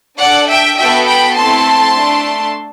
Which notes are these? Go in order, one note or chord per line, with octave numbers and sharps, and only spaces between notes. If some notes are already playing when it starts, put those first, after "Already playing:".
D4 A4 D5 F#5
E5 G5
B3 F#4 A4 E5 G5
G5 B5
A3 C4 E4 A4 A5 C6
A3 D4 A4